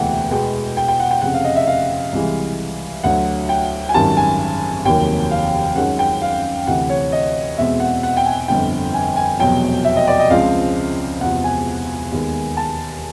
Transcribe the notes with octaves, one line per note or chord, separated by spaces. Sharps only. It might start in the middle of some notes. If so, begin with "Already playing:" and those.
Already playing: E1 D2 C3 E3 A3 F#5 G5
E2 B2 G#3 B3 G5
G5
G5
F#5
G5
F1 F2 C#3 F#5
F5
D#5
E5
F5
C2 C3 E3 G#3
D2 D3 F#3 F#5
G5
G#5
G#1 F#2 D#3 G3 A5
G#5
F1 D#2 D#3 F#3 A#3 G5
F5
F#2 D#3 G#3 C#4 F#5
G5
F5
D2 C3 E3 F#5
C#5
D#5
E2 B2 G#3 C4 E5
F#5
F#5
G5
G#5
G1 F2 D3 G5
G#5
G#5
F1 E2 B2 F#3 G5
E5
D#5
D5
D#5
C#2 C#3 F3 G#3 C4 F5
E1 E2 C3 F3 F#5
G#5
D#2 D#3 G#3 B3
A5